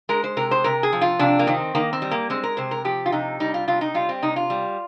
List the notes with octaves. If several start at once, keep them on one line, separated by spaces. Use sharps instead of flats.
G#3 A#4
C5
C3 A#4
C5
C3 A#4
G#4
F3
F4
C3 D4
A#3
D#3 C4
D#3 A#3
C4
G3
A#3
G#3 C4
A#4
C3 C5
A#4
F3 G4
F4
C3 D#4
G3 D#4
F4
C3 F4
D#4
G3 F4
C4
C3 D#4
F4
G3